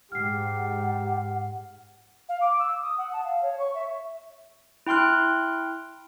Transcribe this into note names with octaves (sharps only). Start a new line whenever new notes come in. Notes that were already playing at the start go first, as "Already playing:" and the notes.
G#2 G4 F#5 F6 C7
F5
D6
E6
D#6
F#5
A5
F5
C#5
C#6
E5
E4 G5 C6 F6 F#6